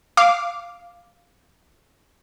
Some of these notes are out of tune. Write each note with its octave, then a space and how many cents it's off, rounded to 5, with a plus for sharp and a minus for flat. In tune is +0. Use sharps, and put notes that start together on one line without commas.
F5 +0 D6 +0